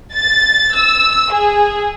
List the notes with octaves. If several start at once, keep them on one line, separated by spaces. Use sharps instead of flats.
A6
E6
G#4